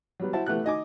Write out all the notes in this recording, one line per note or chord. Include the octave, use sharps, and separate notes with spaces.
F#3 G3 B3
E4 F#4 C5 A5
E3 A3 B3 G4 F#5 F#6
D#4 D#5 G#5 D6